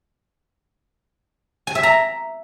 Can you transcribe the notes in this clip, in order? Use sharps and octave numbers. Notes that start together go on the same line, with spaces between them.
G#5
E5
A#5